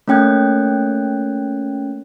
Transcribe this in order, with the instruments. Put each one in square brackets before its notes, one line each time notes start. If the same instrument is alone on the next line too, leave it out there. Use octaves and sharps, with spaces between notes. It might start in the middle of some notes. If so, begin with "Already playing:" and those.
[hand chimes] A3 A#3 C#4 G5 F#6 G#6